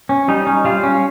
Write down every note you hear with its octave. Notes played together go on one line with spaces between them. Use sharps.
C#4
G3 D#4
C#4
G3 F4
C#4